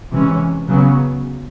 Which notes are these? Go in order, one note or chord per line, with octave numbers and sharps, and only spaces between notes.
C3 E3 G#3 C#4
C#3 F#3 B3